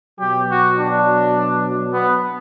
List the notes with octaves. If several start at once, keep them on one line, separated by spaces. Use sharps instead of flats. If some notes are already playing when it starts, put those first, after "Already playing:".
B2 F#3 G4
F#4
D4
B3